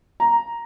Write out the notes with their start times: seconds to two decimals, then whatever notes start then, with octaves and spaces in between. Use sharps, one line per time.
0.20 A#5